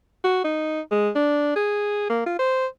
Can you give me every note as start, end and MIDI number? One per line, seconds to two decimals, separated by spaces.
0.24 0.43 66
0.44 0.81 63
0.91 1.10 56
1.15 1.55 62
1.56 2.08 68
2.10 2.22 58
2.26 2.36 65
2.39 2.66 72